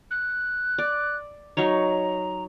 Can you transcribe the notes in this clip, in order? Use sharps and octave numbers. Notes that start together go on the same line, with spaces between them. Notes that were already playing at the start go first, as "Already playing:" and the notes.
F#6
D5
F#3 D#4 C#5 A#5